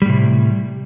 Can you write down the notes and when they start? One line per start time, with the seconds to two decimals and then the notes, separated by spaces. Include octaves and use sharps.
0.02 G3
0.06 A2
0.09 C3